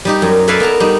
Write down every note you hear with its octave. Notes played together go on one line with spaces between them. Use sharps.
G3 D#4 G4
F#2
A4 B4 D5 E5 F5 G#5
B3 A#4 A5 A#5
G3 D#4